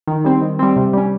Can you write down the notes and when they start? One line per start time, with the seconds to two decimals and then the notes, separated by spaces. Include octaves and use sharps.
0.07 D#3
0.25 G3 C4
0.41 D#3
0.59 G3 C4
0.76 C3
0.93 G3 C#4